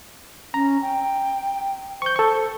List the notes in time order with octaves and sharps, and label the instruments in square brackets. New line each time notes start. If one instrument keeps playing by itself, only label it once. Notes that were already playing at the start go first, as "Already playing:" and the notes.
[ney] C#4 [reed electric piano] A#5
[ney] G5
[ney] C5 [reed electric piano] C#6 G6
[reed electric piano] A4 C#6